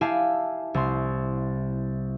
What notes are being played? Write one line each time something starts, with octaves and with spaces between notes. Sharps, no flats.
E4 G4 E5 F5 G#5 A5
C2 C6